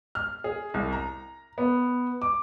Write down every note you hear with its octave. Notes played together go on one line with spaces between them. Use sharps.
F6
G#4
C2
A#5
B3
D6